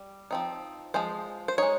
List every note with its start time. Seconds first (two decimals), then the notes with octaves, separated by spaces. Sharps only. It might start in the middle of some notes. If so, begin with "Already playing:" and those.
Already playing: G3
0.31 F3 C4 D#4
0.94 F3 G#3 C5
1.48 C5
1.58 G#3 D#4 C#5